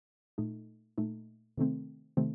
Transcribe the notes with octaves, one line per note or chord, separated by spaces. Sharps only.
A#2 A3 D#4
A#2 A3 D#4
C3 D#3 A3 C4
C3 D#3 A3 C4